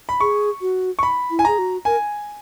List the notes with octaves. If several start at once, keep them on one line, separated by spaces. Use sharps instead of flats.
B5
G#4 C#6
F#4
C#6
B5
E4
G#5
G#4 A#5
F#4
A#4 G#5